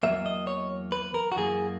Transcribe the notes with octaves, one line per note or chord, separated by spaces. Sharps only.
E2 D#3 F#3 A#3 E5
D#5
C#5
B4
A#4
F#4
F#2 E3 A#3 G#4